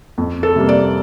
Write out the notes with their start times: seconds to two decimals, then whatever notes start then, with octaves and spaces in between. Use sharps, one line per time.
0.18 F2
0.43 A4
0.56 C3 G3 A#3
0.69 D5